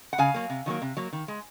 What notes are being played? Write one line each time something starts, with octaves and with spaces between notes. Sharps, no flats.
F#5
C#3 F5 G#5
F#3 A#3
C3
D#3 F#3 A#3
C3
F#3 A#3
D#3
G#3